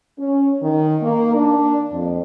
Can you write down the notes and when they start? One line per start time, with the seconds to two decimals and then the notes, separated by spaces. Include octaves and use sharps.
0.19 C#4
0.62 D#3
1.01 A#3
1.34 D4
1.92 F2